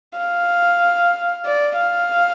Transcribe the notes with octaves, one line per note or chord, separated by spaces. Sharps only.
F5
D5
F5